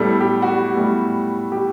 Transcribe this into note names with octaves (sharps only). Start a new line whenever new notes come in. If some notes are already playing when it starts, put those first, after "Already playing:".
Already playing: A2 G3 A3 B3 A4
G4
F#4
G4
A2 G3 B3
G4